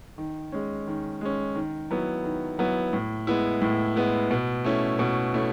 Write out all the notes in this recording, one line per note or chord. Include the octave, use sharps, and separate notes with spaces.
D#3
G#3 C#4
D#3
G#3 C#4
D#3
F#3 B3 E4
D#3
F#3 B3 E4
A2
G#3 B3 E4
A2
G#3 B3 E4
B2
A3 C#4 E4
B2
A3 C#4 E4